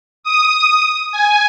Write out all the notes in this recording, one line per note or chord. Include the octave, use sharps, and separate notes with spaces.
D#6
G#5